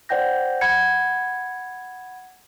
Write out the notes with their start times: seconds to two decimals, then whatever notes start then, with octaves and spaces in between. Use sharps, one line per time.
0.09 C5 D5 F#5 G5 G6 A#6
0.61 F#5 B5 G#6 C#7